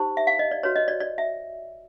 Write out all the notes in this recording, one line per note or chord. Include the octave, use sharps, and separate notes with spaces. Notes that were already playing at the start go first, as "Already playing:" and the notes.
Already playing: D#4 G4 C5
E5
F5
D#5
D5
F#4 B4 C#5
D#5
D5
D5
E5